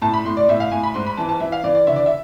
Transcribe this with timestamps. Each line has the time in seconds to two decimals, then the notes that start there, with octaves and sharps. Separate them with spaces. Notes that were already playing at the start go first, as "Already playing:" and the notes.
0.02 A2 A5
0.14 B5
0.25 A2 C6
0.37 D5
0.49 A2 E5
0.60 F5
0.71 A2 G#5
0.83 B5
0.94 G#2 C6
1.06 B5
1.17 E3 A5
1.29 A5
1.40 E3 E5
1.52 F5
1.63 E3 D5
1.75 D5
1.87 D3 E5
1.96 D5
2.06 E5